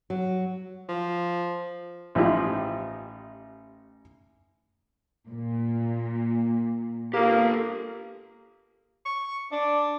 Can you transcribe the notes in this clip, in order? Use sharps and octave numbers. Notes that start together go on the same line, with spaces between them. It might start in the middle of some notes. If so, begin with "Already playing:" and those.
F#3
F3
A1 F3 D#4 E4 G4
A#2
A#3 G4 A4
C#6
D4 D5